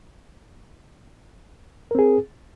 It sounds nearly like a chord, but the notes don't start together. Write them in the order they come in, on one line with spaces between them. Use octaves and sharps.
A#4 C4 G#4